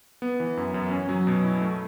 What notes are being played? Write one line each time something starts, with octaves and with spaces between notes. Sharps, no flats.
B3
E3
F#2
F#2
C#4
F#3
B2
E4
A3